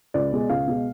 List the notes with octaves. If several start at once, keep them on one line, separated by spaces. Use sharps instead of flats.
C#2 D5
B2 G#3
C#2 F5
B2 G#3